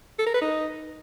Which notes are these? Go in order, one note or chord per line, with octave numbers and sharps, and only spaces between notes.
A4
A#4
B4
D#4